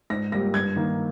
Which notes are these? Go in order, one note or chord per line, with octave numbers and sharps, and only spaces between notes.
G#2 A#6
G3 A#3 A#6
G2 G#6
D#3 A#3